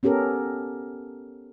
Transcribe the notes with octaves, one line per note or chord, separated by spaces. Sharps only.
B3 C#4 G4 A4 A#4